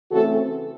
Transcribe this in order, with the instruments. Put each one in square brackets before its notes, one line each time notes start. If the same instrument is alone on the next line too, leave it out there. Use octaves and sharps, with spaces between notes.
[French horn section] C#3 E3 A3 C4 F#4 A4